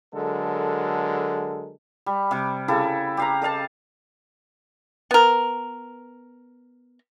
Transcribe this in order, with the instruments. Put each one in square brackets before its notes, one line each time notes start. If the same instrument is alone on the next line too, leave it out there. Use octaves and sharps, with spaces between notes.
[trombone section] D3 F#3 G#3 A4 A#4
[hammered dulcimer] G3
C3 G3
C#3 E4 G4 A4
G4 F5 A#5
A4 D#5 F5 A5
[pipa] B3 A#4